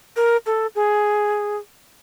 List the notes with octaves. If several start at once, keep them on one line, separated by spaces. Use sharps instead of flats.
A#4
A4
G#4